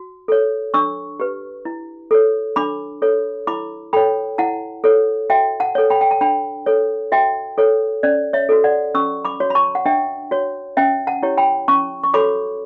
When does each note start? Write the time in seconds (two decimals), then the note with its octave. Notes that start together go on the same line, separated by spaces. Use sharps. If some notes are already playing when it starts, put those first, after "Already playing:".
Already playing: F#4
0.28 A4 C#5
0.74 D4 C#6 E6
1.20 G4 B4
1.65 E4
2.11 A4 C#5
2.56 D4 B5 D6
3.02 A4 C#5
3.47 E4 B5 D6
3.93 A4 C#5 G5 B5
4.38 E4 F#5 A5
4.84 A4 C#5
5.30 F#4 E5 G5
5.60 F#5 A5
5.75 A4 C#5
5.90 G5 B5
6.01 G5
6.11 A5
6.21 D4 G5 B5
6.66 A4 C#5
7.12 F#4 E5 G5
7.58 A4 C#5
8.03 C#4 D5
8.33 C#5 E5
8.49 F#4 A4
8.64 D5 F#5
8.94 C#4 C#6 E6
9.25 B5 D6
9.40 F#4 C#5
9.50 B5
9.55 A5 C#6
9.75 F#5
9.86 D4 E5 G5
10.31 F#4 C#5
10.77 C#4 E5 G5
11.07 F#5 A5
11.23 E4 G4 C#5
11.38 G5 B5
11.68 C#4 A5 C#6
12.03 C#6
12.14 F#4 A4 C#5 B5 D6